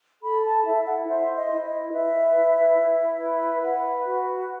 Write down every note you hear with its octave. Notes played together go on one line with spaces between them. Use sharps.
A4 B5
A5
E4 E5
F#5
C5 E5
D#5
E4
D#5
B4 E5
E4
E4
B4
B4 F#5
F#4